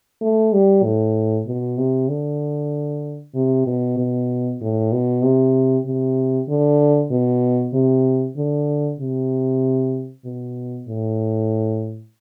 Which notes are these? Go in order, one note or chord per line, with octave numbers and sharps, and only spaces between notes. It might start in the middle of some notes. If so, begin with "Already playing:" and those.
A3
G3
A2
B2
C3
D3
C3
B2
B2
A2
B2
C3
C3
D3
B2
C3
D3
C3
B2
A2